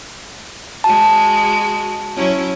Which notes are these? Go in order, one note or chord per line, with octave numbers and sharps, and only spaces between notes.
G#3 F#4 A5
F#3 C#4 E4